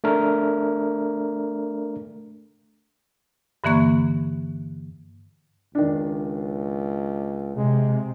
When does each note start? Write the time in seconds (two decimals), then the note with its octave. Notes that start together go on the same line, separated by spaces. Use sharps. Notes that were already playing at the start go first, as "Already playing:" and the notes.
0.04 A3 D4 A#4
3.64 G2 D3 E3 A#3 C#6 F#6
5.75 C#2 D#3 D4
7.57 C3 G#3